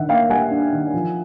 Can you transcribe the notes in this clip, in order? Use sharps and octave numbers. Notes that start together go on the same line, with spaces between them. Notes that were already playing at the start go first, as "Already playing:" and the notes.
Already playing: D#3 D4 E5 F#5
A#3 F5 G5
G3 F#5 G#5
D4
D#3
F3